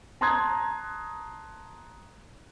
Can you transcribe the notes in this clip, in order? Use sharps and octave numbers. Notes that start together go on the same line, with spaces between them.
A5 A#5 C6 D#6 F#6 G#6